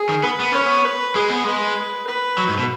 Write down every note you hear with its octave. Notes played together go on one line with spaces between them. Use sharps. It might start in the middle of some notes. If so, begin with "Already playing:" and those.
Already playing: G#4
D#3
B3 B4
B3
C#4 C#5
B3
B4
G#3 G#4
B3
G#3 B4
B4
F#3
G#2
B2